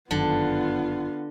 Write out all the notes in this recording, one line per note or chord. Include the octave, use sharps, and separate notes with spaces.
G1 F#2 D3 D#3 B3 F4